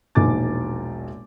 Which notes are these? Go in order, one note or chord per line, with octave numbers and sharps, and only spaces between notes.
E1 A#1 A#2 D#4 D6 A6